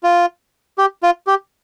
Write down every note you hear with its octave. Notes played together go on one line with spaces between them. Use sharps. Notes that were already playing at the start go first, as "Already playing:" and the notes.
F4
G4
F4
G4